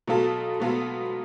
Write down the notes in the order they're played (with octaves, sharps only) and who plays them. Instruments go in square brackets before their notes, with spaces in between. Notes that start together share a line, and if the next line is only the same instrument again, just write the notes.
[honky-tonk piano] B2 F#3 B3 F4 A4
B2 F#3 B3 F4 A4